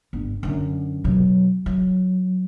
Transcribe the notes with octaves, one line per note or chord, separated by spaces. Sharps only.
G1
F#2 D3
B2 F#3
F#3